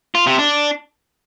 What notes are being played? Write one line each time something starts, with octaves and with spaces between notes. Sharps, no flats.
F4
C3
D4